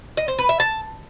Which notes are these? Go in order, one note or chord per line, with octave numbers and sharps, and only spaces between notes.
D#5
C5
B4
E5
A5